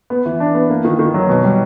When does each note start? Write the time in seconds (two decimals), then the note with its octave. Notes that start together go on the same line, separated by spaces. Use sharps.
0.10 B3
0.26 E3
0.40 D4
0.55 B3
0.70 A#3
0.85 D#3
0.99 D#3
1.14 F#3
1.29 B2
1.44 G3